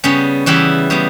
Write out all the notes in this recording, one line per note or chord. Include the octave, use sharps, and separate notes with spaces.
C#3 G3 B3 C#4
C#3 E3 G3 B3 E4
C#3 G3 B3